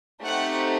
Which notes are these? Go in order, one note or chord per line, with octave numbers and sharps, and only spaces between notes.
A3 C4 D#4 G4 F#5